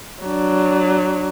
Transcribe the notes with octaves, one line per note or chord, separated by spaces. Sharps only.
F#3 D4